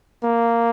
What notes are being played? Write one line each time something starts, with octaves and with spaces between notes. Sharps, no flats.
A#3